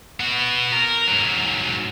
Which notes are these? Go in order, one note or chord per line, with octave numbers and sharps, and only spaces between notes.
B3 F#4
A#4
G#2 F#3